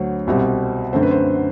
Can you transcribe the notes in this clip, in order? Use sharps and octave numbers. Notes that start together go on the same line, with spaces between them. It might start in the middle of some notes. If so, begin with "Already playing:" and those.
Already playing: D2 D3 F#3 C5
C2 B2 G3 C4
F#2 D3 A3 C4 C5
B4
C5